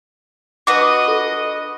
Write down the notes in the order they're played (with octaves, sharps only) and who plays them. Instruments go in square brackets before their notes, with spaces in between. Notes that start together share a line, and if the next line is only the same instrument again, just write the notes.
[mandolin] D4 F#4 B4 [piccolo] D#5 [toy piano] D6
[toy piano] A4